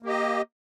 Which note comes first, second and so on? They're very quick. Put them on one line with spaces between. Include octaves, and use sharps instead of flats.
A#3 G4 D#5